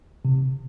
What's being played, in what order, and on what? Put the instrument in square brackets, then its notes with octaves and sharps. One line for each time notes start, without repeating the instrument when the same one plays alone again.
[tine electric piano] C3